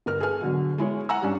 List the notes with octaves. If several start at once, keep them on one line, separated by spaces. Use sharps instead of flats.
G1 A#4 F6
G#4 A4 B4 G#5 F6
B2 D3 F#3
G#3 E4 G#4 C#5
F#5 G#5 A#5 E6
G2 G3 C#4 D4